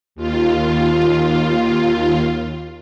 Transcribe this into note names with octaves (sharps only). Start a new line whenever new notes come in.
D#2 F4